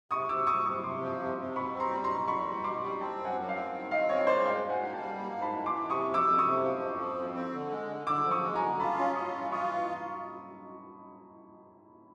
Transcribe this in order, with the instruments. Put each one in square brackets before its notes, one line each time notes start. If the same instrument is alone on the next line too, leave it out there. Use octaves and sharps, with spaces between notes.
[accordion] C3 [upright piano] C#6 D#6
[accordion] C3 [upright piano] D6 E6
[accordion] C3 [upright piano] C#6 D#6
[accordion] C3 [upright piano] C#6 D#6
[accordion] C3 [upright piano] C6 D6
[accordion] F3
C3
C3
[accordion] B2 [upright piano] B5 C#6
[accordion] C4
[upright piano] A#5 C6
[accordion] G3
[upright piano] A#5 C6
[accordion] B2
[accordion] E2 [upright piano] B5 C#6
[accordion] G3
[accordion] B2 [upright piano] C6 D6
[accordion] G3
[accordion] C4 [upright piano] G5 A5
[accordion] F#2
[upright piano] F#5 G#5
[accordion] F#2
[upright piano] F5 G5
[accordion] C4
D#3
[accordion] C4 [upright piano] D#5 F5
[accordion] D#3 [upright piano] C#5 D#5
[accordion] G#3 [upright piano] C5 D5
[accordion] G#2 [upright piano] F5 G5
[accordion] G#2
[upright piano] F#5 G#5
[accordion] A#3
[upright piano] G5 A5
[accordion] G3
A#3
G#2
[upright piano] A5 B5
[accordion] E3
[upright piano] C6 D6
[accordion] E3
[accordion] C3 [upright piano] C#6 D#6
[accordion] F2
[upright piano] D6 E6
[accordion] F2
[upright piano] C#6 D#6
[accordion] C3
F3
F2
F3
F2
C4
D3
G#3
D3
[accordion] D3 [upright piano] D6 E6
[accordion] F3
[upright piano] C#6 D#6
[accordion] G#3
[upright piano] G#5 A#5
[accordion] D3
[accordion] F4 [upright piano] A5 B5
[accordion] C#4 [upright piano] A#5 C6
[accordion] F4 [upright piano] C#6 D#6
[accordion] E3
[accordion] F4 [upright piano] C#6 D#6